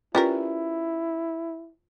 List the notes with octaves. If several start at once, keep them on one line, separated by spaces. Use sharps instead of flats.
C#4 E4 F4 G4 A#4 B4 D5